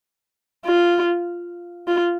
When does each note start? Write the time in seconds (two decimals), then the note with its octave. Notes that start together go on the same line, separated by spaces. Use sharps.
0.65 F4
1.88 F4